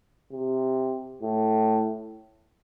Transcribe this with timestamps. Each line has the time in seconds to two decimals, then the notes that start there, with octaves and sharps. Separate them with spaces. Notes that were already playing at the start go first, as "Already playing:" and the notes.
0.32 C3
1.22 A2